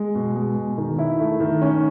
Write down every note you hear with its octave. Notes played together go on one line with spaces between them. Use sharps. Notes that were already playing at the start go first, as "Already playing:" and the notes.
Already playing: G#3
B2
G#3
B2
D#3
E4
A3
D#3
C#4